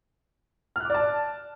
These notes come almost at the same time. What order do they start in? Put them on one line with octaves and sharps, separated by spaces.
F6 F#6 D6 D5 A5